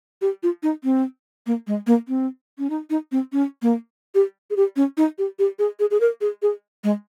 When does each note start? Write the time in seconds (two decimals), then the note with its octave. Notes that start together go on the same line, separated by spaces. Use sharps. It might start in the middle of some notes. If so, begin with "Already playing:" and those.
0.22 G4
0.43 F4
0.63 D#4
0.84 C4
1.47 A#3
1.67 G#3
1.87 A#3
2.08 C4
2.58 C#4
2.70 D#4
2.90 D#4
3.12 C4
3.32 C#4
3.62 A#3
4.15 G4
4.50 G#4
4.56 G4
4.76 C#4
4.97 D#4
5.18 G4
5.39 G4
5.59 G#4
5.80 G#4
5.91 G#4
6.01 A#4
6.21 G#4
6.42 G#4
6.84 G#3